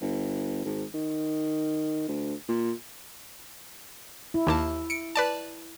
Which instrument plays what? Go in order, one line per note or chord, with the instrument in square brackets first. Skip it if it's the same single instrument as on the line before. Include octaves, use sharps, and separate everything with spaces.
[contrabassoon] G1
G#1
D#3
D2
A#2
[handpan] E4
[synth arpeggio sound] D#2 A#3 A5
C#7 D7
B4 D5 A5